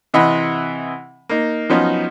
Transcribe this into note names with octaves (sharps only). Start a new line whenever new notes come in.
C3 E3 D#5 F#5 B5
A#3 D#4
F3 F#3 B3 C#4 D#4